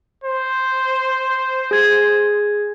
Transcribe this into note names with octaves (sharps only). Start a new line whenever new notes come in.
C5
G#4 G#6